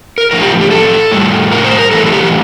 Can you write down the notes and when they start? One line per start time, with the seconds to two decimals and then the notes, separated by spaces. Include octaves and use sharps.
0.18 A#4
0.31 A2 F3 A#4
0.42 G4
0.61 G4
0.71 A4
1.12 A2 G3
1.51 A#4
1.64 C5
1.78 A#4
1.91 A2 E3 G3 A4
2.06 A4
2.12 G4